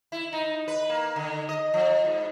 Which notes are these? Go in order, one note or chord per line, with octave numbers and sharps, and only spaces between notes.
E4
D#4
B4
A#3
D3
D#5
F3
G#2